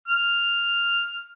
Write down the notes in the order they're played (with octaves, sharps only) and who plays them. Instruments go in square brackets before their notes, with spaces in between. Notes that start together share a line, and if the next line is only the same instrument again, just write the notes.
[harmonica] F6